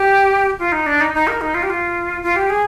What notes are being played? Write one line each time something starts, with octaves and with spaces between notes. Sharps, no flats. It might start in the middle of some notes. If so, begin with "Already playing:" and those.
Already playing: G4
F4
D#4
D4
D#4
D#4
A#4
D#4
F4
G4
F4
F4
G4
G#4